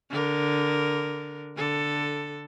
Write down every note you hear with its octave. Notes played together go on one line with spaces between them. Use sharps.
D3 A#4
D3 A4